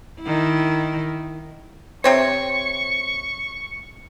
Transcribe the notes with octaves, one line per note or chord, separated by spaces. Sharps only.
D#3 E4
C3 C4 C#5 C#6